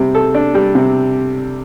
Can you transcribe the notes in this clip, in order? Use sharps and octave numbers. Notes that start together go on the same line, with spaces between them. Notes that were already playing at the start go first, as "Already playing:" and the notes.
Already playing: C3 G3
A4
D4
G3
C3